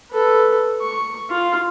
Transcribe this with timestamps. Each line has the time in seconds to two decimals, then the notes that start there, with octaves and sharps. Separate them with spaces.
0.12 A4 B4
0.82 C#6
1.30 F4